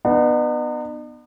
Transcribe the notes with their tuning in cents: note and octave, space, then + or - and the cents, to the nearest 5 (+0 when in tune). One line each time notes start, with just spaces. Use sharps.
B3 -5 D#4 -45